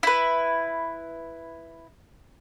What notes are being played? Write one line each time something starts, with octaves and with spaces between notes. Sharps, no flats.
E4 B4